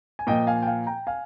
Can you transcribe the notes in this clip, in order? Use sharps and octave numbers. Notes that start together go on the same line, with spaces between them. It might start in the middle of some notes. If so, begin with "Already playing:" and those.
G#5
A#2 F3 D#5 G5
F5 G#5
G5
F5 G#5
G5 A#5
F5 G#5